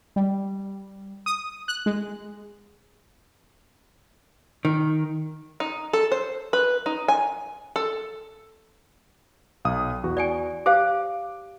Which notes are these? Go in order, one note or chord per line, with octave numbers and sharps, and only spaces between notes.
G3
D#6
F#6
G#3
D#3
D#4
A4
C5
B4
D#4
G#5
A4
B1 F5 D#6
E2 F#4
D5 G5 G#5
G4 C5 F5 D6